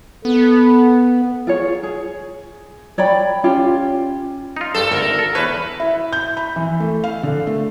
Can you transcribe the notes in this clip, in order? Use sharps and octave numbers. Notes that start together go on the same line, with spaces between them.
B3 A4
F4 G#4 C#5
G#4
C#5 D5 G5 B5
C#4 F4 G4
D#4 F4
G2 A4 A5
G#1 D2 A#4
A4
E2 B4 C#5
E4
G6
B5
E3
A3
F5
D3
A3